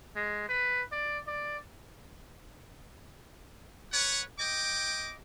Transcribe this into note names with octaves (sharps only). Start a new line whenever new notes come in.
G#3
B4
D5
D5
B4 C#5 F#5
D#5 G5 D6